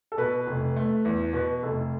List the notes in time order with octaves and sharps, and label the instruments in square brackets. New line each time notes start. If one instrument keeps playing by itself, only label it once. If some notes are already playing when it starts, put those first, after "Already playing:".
[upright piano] A4
[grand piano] B2 [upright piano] B4
[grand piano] F1
A3
E2
[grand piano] B2 [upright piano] B4
[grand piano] F1 [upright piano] A4